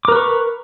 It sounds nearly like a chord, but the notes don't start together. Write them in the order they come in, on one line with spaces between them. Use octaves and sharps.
D6 A#4 B4 C#6